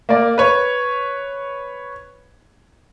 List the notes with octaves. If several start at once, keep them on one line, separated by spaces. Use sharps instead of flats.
A#3 D5
B4 C#5